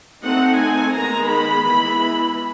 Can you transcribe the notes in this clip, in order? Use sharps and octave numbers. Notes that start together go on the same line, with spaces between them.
A3 C4 D#4 F#5
G#5
D#3 G#3 B3 A#5
B5
E3 G#3 B3 E4